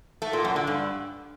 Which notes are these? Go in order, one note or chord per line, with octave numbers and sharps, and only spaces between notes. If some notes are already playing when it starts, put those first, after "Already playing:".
A3
A#2
F#2
D3
G2